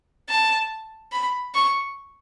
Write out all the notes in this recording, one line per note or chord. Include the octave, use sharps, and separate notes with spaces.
A5
B5
C#6